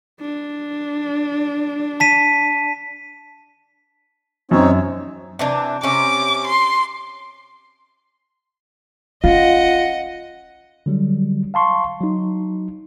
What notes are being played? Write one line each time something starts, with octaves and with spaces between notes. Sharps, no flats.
D4
A5 B6 D#7
F#2 C4 D#4 C#5
C3 E3 D4
C3 C#4 D6
C6
C#4 F4 D#5 F5 F#5 A#6
D3 F#3 G3
F5 A5 C6 C#6
F#3 D#4